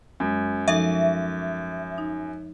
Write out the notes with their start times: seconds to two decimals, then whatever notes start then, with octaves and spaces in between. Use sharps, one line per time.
0.20 F#2 G#3
0.68 F3 D#4 A4 E5
1.98 D#4